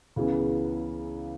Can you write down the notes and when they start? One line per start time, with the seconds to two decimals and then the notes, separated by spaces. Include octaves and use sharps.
0.16 C#2 C#3 E3 B3